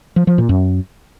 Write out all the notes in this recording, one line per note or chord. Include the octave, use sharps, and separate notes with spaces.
F3
F3
A#2
F#2